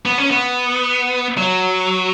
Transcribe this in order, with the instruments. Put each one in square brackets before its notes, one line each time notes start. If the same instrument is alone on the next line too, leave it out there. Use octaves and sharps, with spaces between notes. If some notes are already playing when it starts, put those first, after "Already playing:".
[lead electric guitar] B3
C#4
B3
F#3